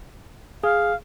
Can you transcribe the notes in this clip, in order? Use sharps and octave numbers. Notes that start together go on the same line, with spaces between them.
G#4 F5